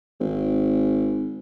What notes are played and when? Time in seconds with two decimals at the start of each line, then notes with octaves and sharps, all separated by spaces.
0.20 G#1